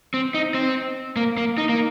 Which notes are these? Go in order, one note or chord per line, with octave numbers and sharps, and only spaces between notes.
C4
D#4
C4
A#3
A#3
D#4
A#3